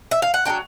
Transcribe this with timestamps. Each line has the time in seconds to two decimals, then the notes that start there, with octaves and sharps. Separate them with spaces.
0.11 E5
0.22 F5
0.34 F#5
0.45 F#3 A#3 D4 G5